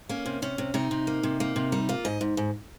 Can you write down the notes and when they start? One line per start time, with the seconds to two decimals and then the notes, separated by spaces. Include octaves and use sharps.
0.09 A#3 C#4
0.26 C3
0.42 C3 C#4
0.58 C3
0.74 C3 D#4
0.91 C3
1.07 A#3
1.23 C3
1.40 A#3
1.56 C3
1.72 G3 D#4
1.89 A#3 F4
2.05 G#2 D#5
2.21 G#2
2.37 G#2